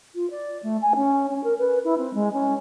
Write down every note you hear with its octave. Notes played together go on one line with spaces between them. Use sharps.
F4
D5
A3
G#5
C#4
C#4
A#4
B4
E4
C4
G#3
C#4